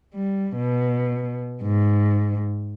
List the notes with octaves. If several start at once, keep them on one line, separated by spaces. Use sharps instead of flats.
G3
B2
G#2